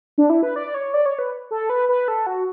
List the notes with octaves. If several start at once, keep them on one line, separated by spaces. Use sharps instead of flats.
D4
E4
B4
D5
C#5
D5
C#5
B4
A4
B4
B4
A4
F#4